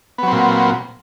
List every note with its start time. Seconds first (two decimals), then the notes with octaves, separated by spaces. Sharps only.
0.18 B3
0.23 F#3
0.28 C4
0.32 A#2